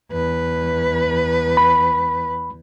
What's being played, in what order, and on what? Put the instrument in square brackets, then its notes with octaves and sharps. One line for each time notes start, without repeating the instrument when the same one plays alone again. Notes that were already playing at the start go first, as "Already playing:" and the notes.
[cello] E2 B4
[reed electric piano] B5